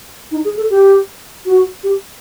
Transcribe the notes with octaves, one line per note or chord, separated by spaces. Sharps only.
D#4
G#4
A4
G4
F#4
G4